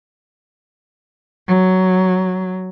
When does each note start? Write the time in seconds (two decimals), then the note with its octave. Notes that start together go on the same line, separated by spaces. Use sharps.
1.48 F#3